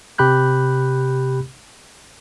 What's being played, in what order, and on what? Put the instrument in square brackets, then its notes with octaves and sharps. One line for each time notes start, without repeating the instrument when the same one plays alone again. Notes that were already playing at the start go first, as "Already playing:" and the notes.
[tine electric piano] C3 G4 B5 F#6 G6